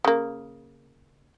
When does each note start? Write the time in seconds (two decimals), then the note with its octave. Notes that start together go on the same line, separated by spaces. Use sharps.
0.05 C#3 A#3